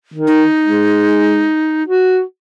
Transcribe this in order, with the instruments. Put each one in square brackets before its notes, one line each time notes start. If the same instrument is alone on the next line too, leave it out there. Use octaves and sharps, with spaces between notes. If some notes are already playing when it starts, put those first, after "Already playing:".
[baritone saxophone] D#3
[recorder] D#4
[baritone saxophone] G#3
F#4